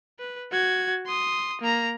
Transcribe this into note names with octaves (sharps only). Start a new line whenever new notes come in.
B4
F#4 G#6
C6 D#6
A#3 A#5